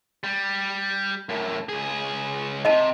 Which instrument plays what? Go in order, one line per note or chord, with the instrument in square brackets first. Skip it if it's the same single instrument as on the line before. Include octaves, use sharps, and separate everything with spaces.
[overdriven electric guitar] G3
F#2 A2
C#2 G#4
[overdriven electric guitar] A2 C3 [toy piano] D#5 A5